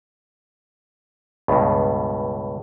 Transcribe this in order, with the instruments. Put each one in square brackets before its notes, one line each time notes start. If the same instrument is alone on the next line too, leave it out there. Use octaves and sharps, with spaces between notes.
[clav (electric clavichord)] C#2 G2 B2